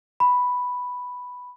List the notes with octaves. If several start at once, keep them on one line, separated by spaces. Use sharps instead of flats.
B5